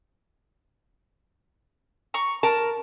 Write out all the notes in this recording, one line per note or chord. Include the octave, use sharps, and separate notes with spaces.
A#5 C#6
A#4 A5